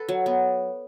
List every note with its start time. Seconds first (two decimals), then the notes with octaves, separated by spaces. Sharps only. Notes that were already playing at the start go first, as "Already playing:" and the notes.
Already playing: A4 B4
0.09 F#3
0.26 B3